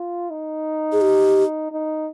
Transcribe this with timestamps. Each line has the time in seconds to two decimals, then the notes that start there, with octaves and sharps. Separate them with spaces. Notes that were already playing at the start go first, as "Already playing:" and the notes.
Already playing: F4
0.30 D#4
0.92 G#4
1.01 G4
1.72 D#4